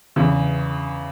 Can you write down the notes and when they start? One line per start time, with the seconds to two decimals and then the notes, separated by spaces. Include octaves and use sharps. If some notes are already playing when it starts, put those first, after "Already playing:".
0.16 E2 C#3 E3